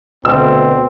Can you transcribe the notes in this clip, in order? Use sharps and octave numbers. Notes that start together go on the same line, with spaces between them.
D2 B2 C4 E6